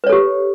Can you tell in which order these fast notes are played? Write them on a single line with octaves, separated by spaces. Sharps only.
B4 C#5 A4 G4